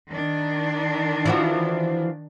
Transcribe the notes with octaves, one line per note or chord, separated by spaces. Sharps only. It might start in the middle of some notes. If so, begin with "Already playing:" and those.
D#3 D4
E3 F3 F#4